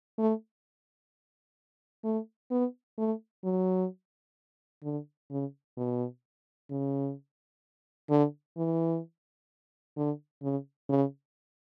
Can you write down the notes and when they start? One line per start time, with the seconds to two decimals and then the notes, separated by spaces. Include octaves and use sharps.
0.18 A3
2.04 A3
2.51 B3
2.98 A3
3.44 F#3
4.83 D3
5.30 C#3
5.77 B2
6.71 C#3
8.09 D3
8.57 E3
9.97 D3
10.42 C#3
10.89 C#3